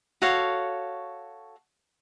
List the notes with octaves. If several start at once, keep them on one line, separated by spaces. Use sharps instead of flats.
F#4 A4 C#5 F5